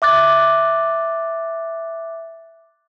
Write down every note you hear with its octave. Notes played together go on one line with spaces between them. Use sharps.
E5 D6 F#6 A6